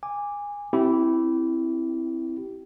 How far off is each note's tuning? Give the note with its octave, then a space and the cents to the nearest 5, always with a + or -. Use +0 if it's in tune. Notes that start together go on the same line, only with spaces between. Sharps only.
G#5 -20 D6 +0
C4 +0 E4 +0 G4 -25